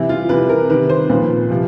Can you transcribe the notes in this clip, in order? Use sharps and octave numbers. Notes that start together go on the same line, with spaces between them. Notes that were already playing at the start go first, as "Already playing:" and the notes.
Already playing: C3 E3 E4
F4
C3 E3 B4
A#4
C3 D#3 B4
C5
A#2 F3 B4
C3 F3